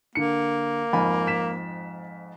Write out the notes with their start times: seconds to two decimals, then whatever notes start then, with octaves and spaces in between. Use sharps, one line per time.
0.15 D3 A#3 C#7
0.93 F2 G#2 G#5 B5
1.27 B6 E7